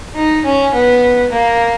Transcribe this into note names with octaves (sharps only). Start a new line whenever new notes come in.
D#4
C#4
B3
A#3